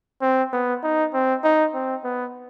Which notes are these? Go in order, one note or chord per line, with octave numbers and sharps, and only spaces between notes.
C4
B3
D#4
C4
D#4
C4
B3